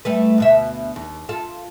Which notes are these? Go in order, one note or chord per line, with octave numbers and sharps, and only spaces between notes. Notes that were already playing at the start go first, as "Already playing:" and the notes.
G3 A3 B4
D2 B2 E5
D#2
F4 A4